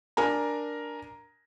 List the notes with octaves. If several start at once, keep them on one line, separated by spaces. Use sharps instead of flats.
D4 A#4 G#5 A#5